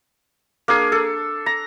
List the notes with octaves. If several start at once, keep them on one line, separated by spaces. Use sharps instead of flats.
A#3 D4 G#4
A4
A#5